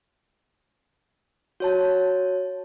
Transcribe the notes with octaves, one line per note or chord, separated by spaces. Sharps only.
F#4 C#5 A5